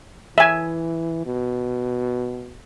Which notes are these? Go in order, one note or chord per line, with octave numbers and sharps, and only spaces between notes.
E3 E5 G#5
B2